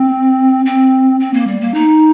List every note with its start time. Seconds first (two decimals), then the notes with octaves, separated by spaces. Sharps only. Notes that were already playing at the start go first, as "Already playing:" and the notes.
Already playing: C4
0.66 C4
1.20 C4
1.33 A#3
1.47 G3
1.61 A#3
1.74 D#4